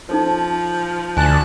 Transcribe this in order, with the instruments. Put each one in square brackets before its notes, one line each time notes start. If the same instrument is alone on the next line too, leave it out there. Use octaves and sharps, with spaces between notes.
[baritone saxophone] F3 [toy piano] D#4 A4 C5
[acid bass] D2 [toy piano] G#5 [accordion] A5 F#6